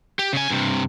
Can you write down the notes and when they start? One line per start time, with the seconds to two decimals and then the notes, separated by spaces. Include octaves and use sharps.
0.19 G4
0.33 C#3 G#5
0.50 G2 C3